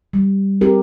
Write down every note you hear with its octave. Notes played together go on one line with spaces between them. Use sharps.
G3
C4 G4 A#4